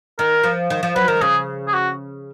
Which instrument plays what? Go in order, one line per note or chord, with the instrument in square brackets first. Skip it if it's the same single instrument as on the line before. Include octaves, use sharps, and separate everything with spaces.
[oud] D#3 [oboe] A#4
[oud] F3
D#3
F3
[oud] F#3 [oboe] B4
[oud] D#3 [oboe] A#4
[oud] C#3 [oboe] G#4
[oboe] G#4
F#4